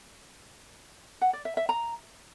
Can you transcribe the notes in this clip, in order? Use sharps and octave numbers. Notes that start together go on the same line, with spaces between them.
F#5
D5
E5
E5
A#5